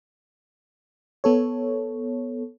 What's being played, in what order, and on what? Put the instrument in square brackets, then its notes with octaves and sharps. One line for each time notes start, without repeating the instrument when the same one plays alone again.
[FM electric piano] B3 A4 C#5